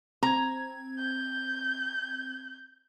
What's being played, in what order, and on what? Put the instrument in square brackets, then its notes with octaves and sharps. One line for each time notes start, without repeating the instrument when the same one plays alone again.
[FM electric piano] C4 G#6 [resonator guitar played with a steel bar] A#5
[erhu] G6